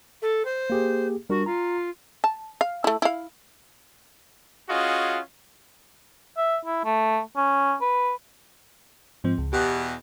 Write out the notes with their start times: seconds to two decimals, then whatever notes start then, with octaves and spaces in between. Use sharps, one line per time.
0.22 A4
0.45 C5
0.70 A#3 G4 G#4
1.30 G3 D4 F#4 A#4
1.46 F4 A#5
2.24 A5
2.61 F5
2.84 A3 E4
3.02 E4 F5
4.70 C#4 F4 F#4 G#4 D#5
6.37 E5
6.65 E4
6.85 A3
7.36 C#4
7.81 B4
9.24 G#2 F3 C4
9.38 C#2
9.53 E2 B2 G4